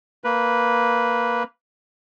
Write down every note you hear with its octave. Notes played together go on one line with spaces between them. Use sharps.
A#3 B4